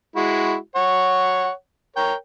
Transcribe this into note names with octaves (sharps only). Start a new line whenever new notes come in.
G#3 E4 F#4
C#5 F#5
A#4 C#5 G5